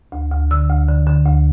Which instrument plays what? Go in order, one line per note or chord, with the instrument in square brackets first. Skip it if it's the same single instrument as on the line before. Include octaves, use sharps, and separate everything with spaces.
[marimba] D2
D2
D3 E6
D2
D3
D3
D2